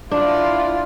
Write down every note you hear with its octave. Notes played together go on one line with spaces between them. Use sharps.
D4 E4 F4 D5